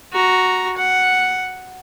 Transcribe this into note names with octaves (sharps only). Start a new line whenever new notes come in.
F#4 A#5
F#5